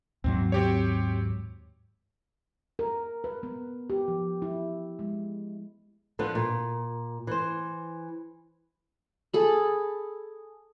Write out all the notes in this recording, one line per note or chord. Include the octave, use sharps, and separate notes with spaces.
D#2 G#2 F#3 C4
C4 G4 C#5
A#4
B4
B3
G4
F3
E4
G#3
D3 F3 B3
A#2
E3 C5
G#4 A4 B5